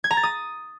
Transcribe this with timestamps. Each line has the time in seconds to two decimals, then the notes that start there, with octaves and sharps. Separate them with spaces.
0.04 G#6
0.11 A#5
0.17 A6
0.23 D#6